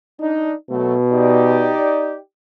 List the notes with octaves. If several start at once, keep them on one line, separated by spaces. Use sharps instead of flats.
D4 D#4
B2 F#3 A3
D#4 G4 D5